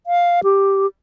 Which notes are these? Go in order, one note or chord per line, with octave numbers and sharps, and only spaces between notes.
F5
G4